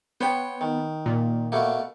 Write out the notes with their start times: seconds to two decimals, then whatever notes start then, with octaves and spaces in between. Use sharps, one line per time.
0.21 B3 C5 C#5 G5
0.61 D#3
1.06 A#2
1.52 B2 A3 A#3